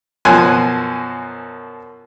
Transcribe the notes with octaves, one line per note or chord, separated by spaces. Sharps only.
F#2 B2 F3 G#5 C6 F#6